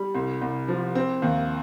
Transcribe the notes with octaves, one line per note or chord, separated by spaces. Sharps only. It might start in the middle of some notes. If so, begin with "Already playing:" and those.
Already playing: G3
C2
C2
F3
C4
D#2